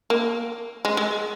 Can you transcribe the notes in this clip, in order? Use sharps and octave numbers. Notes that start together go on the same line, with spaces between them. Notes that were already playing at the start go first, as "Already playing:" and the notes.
A#3
G#3
G#3